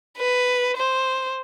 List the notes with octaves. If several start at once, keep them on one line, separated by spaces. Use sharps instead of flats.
B4
C5